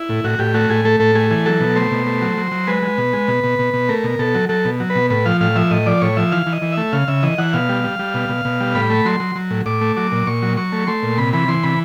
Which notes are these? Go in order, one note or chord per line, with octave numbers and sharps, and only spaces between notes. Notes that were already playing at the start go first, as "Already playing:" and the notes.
Already playing: E4
A2
A2 F#4
A2 G4
A3 F#4
A2 G#4
A3 A4
A2 A4
A3 G#4
E3 G#4
F#3 A4
B2
A3 C5
B2
A3
F#3
F#3
F#3
G#3 B4
G#3
B2
G#3
B2
B2
B2
B2
A3 A#4
B2
B2 A4
F#3
F#3 A4
B2
F#3
B4
B2
A2 B4
F3 F5
A2 F5
F3 E5
A2 D#5
F3 D5
A2 C#5
F3 E5
E3 F5
E3
D#5
E3
E5
A3
C#3 F5
C#3 E5
E3 D#5
E3 F#5
B2 F5
G3
G3
G3
B2
B2
B2
G3
A2 B5
A3
F#3 C6
F#3
F#3
A2
A2 D6
A3
F#3 D6
A#2
A#2 C#6
F#3
F#3 C#6
A3
A3 C6
A#2
C3 B5
E3 B5
E3 C6
C3 B5